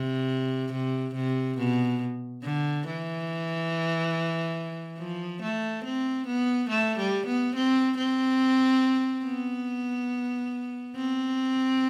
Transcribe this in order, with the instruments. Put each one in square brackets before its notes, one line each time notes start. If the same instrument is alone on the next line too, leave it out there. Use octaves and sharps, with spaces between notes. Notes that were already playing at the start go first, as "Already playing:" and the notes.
Already playing: [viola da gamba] C3
C3
C3
B2
D3
E3
F3
A3
C4
B3
A3
G3
B3
C4
C4
B3
C4